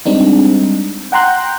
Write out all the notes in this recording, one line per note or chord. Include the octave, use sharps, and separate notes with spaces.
G3 G#3 C4 D4 D#4
F#5 G5 A#5 C6 F#6 G6